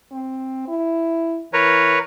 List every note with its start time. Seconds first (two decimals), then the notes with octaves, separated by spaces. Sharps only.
0.12 C4
0.68 E4
1.53 E3 A#4 B4 C#5